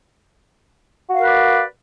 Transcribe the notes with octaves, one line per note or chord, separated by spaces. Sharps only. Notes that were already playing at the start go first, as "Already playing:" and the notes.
F#4 A#4 B4 D5 F5